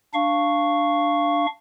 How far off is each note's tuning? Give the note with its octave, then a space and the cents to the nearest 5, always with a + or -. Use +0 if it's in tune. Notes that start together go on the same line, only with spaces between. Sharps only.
D4 +5 F5 -10 C#6 +0